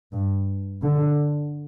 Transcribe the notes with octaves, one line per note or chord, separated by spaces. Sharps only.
G2
D3